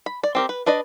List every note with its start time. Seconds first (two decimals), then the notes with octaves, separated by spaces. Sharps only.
0.06 B5
0.23 D5
0.35 C4 G4 A#4
0.49 B4
0.66 D4 B4 D5 D#5